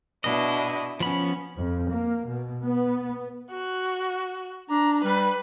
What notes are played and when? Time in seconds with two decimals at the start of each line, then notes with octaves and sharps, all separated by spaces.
0.24 B2 D4 E4 D#5
1.00 F3 B3 C#4 B5
1.56 F2
1.89 A#3
2.26 B2
2.64 B3
3.50 F#4
4.70 D4 A#5
5.04 G3 B4